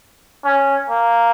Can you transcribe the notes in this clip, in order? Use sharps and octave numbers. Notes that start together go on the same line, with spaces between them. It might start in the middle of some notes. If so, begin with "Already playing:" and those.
C#4
A#3